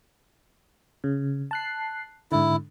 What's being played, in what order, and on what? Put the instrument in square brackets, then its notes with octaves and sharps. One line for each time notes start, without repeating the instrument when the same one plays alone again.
[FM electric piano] C#3
A5 F#6 C7
[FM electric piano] G#2 D3 [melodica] E4